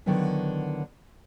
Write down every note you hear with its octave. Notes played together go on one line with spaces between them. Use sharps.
D3 D#3 F#3 B3 E4